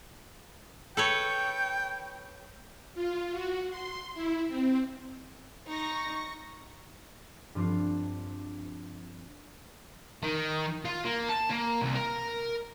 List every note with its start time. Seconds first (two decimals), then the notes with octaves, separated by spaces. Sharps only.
0.97 A4 B4 C#5 G5
2.95 F4
3.32 F#4
3.70 C6
4.14 E4
4.48 C4
5.68 D#4 C#6 A#6
7.55 G2 F3 C4 D4 F4
10.23 D#3
10.85 F4
11.04 A#3
11.29 A5
11.50 A#3
11.82 C2
11.95 A#4